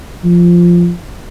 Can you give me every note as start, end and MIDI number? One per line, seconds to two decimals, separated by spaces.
0.24 0.92 53